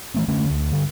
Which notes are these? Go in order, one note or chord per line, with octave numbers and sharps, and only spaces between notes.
E3 A3 C4
D3 A3 C#4
D2
G2 D3